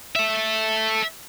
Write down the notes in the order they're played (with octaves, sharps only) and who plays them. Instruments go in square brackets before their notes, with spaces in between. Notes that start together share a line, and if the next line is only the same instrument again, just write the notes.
[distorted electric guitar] A4 E5